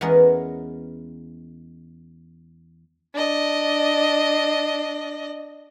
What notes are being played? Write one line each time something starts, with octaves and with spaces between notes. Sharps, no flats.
E2 G#3 B3 C#4 A#4 D#5
D4 D#5